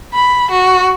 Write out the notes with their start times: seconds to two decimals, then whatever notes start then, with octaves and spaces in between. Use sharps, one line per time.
0.14 B5
0.51 F#4